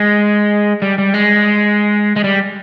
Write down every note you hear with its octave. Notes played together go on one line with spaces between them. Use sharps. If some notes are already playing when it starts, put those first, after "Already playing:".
Already playing: G#3
G3
G3
G#3
G#3
G3